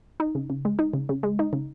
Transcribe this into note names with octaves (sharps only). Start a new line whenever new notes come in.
D#4
C#3
C#3
G#3
D#4
C#3
C#3
G#3
D#4
C#3